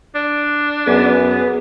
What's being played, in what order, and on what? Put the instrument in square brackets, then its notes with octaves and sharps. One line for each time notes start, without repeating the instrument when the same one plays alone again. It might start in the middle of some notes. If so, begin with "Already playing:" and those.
[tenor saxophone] D4
[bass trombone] F#2 [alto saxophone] B3 [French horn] G#4